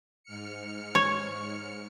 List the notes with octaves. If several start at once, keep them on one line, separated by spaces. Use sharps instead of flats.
G#2 F6 C#7
C#5